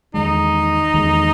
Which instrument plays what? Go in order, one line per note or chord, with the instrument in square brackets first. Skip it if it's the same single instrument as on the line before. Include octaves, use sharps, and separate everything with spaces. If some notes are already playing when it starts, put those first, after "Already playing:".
[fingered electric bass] E2 D#3 G#3 [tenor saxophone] D#4
[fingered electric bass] E2 D#3 G#3